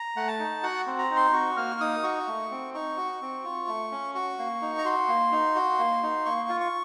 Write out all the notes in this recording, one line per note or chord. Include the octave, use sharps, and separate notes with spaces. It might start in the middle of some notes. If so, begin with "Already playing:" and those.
Already playing: A#5
A3 F#5
A5
D#4
F#4 F#5
C4
A#5
D#4
C6
F#4 C#6
A#3 F6
C#6
D#4 D#6
F#4 C#6
A3
C4
D#4 C#6
F#4
C4
F4
A3
C#4
F#4 C#6
A#3
D#4
A#5
F#4 C6
A#3
D#4
F#4
A#3
D#4
A#3 C#6
F4
C#6